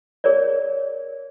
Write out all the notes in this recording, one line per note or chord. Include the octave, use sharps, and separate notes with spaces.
G#4 A#4 C#5 D5